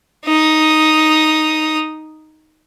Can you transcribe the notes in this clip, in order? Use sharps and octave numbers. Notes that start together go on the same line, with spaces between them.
D#4 D#6